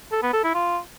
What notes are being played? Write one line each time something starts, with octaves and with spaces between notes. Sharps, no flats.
A4
B3
A4
E4
F4